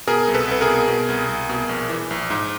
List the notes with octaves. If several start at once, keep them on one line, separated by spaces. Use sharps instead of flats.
B2 G#4 A#4
C2
A4 B4
C2 B4
G#4 A#4
B2
B2
C2
C2
B2
A#1
E3
A#1
G#2